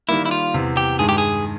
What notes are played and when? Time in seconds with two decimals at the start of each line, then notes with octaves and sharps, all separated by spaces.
0.08 D#3 G3 A#3 E4
0.26 E4
0.31 F4
0.54 E2 C3 E3
0.77 G4
0.99 G2 D#3 G#3 G#4
1.09 G4
1.18 G#4